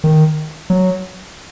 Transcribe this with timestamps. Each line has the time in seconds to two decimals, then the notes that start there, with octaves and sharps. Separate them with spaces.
0.04 D#3
0.70 F#3